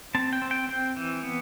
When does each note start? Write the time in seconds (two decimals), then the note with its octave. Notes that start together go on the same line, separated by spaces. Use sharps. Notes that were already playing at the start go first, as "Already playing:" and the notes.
0.15 C4 A5
0.33 G5
0.42 C4
0.51 G5
0.69 C4 G5
0.96 E3
1.23 B3